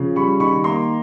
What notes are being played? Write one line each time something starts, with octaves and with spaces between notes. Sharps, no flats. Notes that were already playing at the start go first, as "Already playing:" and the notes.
Already playing: C#3 F3
G3 B5 C#6
D#3 B5 C#6
A#3 A#5 C6